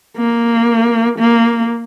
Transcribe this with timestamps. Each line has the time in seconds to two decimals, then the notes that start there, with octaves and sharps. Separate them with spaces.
0.17 A#3
1.19 A#3